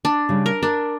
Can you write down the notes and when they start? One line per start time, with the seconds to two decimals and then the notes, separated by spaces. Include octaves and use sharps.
0.05 D4
0.29 C#3 G3
0.46 A#4
0.63 D4 A#4